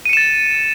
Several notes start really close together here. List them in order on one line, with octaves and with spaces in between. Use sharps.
D#7 C#7 E7 A6